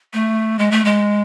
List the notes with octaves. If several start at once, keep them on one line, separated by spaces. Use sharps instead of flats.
A3
G#3
A3
G#3